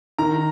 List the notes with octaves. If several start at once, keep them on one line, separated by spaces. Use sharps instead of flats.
D#3 A#5